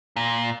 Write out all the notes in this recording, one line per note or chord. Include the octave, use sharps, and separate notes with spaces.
A#2